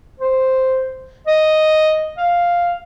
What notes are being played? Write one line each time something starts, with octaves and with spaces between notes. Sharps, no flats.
C5
D#5
F5